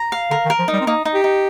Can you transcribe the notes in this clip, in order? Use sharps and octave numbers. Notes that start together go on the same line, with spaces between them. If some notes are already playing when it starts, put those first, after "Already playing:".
Already playing: A#5
F5
D3 A#4
D#3
A#4
F3
G3 D#4
C4
A#3 D#4
D#4
G4
D#4